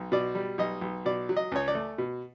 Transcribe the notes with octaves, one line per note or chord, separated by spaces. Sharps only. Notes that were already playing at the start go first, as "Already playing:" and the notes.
Already playing: B1
B2 D5
G3
B1 D#5
B1
B2 D5
F#3
D#5
C#2 C#5
D5
A3
B2